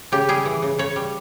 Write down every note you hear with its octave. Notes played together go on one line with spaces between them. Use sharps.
C#3 G4
G3 G#4
E3
C#3
C#3 C#5
G3